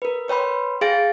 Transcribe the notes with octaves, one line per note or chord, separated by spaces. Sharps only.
A#4 B4
B4 C#5 G5 B5 C6
G#4 F5 G5 A6 A#6 D7